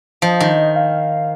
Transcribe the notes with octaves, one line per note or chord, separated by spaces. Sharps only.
F3 D#5
D#3
F5